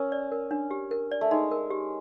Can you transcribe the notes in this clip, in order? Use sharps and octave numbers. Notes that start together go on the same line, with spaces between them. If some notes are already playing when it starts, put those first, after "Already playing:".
Already playing: C#4 A#4
D5
A#4
D4
G4
A#4
D5
A3
G#3 D#4
A#4
G4